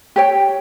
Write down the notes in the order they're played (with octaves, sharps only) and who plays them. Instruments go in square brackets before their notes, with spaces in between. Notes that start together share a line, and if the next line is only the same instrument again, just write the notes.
[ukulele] G4 C#5 G5